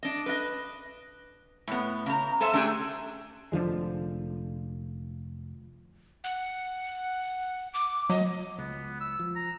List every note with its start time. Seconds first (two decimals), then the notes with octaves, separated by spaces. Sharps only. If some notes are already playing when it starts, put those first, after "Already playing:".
0.03 D4 D#5
0.26 B4 D#5
1.67 A2 B3
2.06 C#3 A#5
2.41 G#4 A4 C5 E5
2.53 A3 D4 G4 G#4 D#5 G#5
3.52 F1 D3 F3 G#3
6.24 F#5
7.74 D6
8.10 F#3 D#5
8.58 C#2 B3
9.01 E6
9.19 F3
9.36 A#5